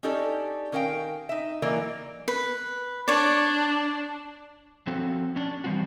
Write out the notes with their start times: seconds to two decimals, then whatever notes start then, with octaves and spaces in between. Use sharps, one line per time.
0.03 C#4 D#4 G4 A4 D5
0.72 D#3 C#4 A#4 F5 G5
1.29 D#4 E5
1.62 E3 F#3 A#3 D#4 A#4 D5
2.28 B4
3.08 D4 C#5 D5
4.87 F3 C4 F#4 A4
5.36 C#4 D4
5.64 E3 F3 G3 C4 F4 F#4